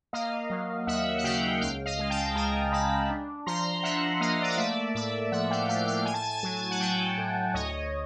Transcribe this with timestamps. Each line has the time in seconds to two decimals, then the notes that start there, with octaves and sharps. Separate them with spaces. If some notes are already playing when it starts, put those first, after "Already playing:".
0.13 A#3 D#5 F5
0.50 F#3
0.87 D#2 E5 F#5
1.18 F#5
1.24 C#3 F5 G5
1.61 C#2 F5 G5
1.86 D#5 F5
1.99 G#3
2.10 G5 A5
2.35 C#2 G#5 A#5
2.72 G#3 A5 B5
3.10 D4
3.46 F3 A#5 C6
3.83 F3 E5 F#5
4.20 A#3 D#5 F5
4.42 D5
4.50 D#5
4.58 A3 D5 E5
4.95 A2 D5 E5
5.32 F3 E5 F#5
5.51 F5 G5
5.69 A3 F5 G5
5.88 F5 G5
6.06 A2 G#5
6.14 A5
6.22 G#5
6.30 A5
6.39 G#5
6.43 F#3 A5
6.55 G#5
6.63 A5
6.71 F#5 G#5
6.80 F#3 G5 A5
7.18 A2
7.54 D2 C#5 D#5